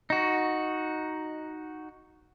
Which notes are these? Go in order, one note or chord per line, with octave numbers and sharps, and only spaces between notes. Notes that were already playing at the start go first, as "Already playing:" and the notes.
D#4 F#4